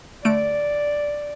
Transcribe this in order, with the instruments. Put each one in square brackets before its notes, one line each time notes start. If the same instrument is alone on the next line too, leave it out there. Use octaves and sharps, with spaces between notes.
[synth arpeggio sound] D3 A3 D7 [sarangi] D5